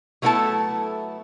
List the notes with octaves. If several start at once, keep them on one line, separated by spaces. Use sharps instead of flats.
F#3 A3 B3 E4 A4 A5